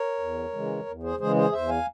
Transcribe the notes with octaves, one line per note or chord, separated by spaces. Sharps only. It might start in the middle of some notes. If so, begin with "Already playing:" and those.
Already playing: A#4 C#5
E2
C#3 E3 G#3
E2
G#4 C5
C#3 E3 G#3 G#4 C5
G#4 C5
E2 C5 E5
F5 G#5